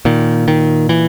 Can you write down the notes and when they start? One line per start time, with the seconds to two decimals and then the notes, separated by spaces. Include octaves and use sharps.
0.05 A#2 D#3
0.48 D#3
0.89 E3